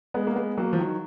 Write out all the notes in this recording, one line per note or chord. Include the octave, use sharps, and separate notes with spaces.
G#3 B3
A#3
G#3 B3
F#3 A#3
F3
D#3 F#3